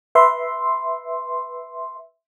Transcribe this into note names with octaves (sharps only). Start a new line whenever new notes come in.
B4 E5 C6